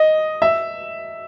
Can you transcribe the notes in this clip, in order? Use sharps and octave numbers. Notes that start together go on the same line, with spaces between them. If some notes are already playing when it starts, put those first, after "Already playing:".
Already playing: D#5
E5